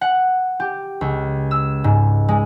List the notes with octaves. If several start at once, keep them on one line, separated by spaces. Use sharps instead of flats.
F#5
G4
C#2
E6
G#2
G#3